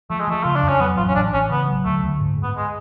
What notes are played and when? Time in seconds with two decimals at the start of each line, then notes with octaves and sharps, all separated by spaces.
0.10 F3 A3
0.20 G#3
0.28 F3 A3
0.44 C#3 F4
0.56 D4
0.63 F2
0.68 C#4
0.80 F#3 B3
0.97 A1 F4
1.08 C#4
1.15 A1 D4
1.33 A1 C#4
1.50 C#3 B3
1.68 F#3
1.85 D2 A3
2.03 D2
2.20 G#2
2.38 G#2
2.43 B3
2.56 G#3